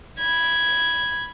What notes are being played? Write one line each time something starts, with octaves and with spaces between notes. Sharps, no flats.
B5 G#6